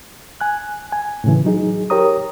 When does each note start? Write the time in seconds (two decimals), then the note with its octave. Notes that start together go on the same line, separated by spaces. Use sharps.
0.41 G#5 F#6
0.92 G#5
1.24 A2 C#3 E3
1.45 F#3 D#4 G#4
1.90 G4 A#4 C#5 A#5 D#6